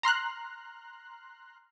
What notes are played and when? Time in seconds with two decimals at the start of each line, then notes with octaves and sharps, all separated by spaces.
0.03 A#5 C6 F6 F#6